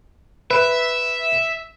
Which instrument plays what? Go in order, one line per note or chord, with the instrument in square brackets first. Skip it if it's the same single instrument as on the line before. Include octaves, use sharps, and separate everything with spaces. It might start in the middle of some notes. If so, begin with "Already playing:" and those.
[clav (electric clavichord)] B4 [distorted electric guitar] E5